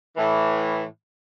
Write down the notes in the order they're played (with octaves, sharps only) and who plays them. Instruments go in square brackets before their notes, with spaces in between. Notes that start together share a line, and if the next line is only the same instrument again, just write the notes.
[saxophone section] A2 E3